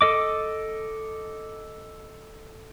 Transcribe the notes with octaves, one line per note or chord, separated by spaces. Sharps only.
A4 D#5 D6